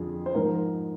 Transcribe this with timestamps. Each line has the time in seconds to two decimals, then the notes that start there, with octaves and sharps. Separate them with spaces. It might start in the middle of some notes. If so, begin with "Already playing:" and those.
Already playing: F2 D3 F3 G#4
0.26 C5
0.35 G#2 F3 A#4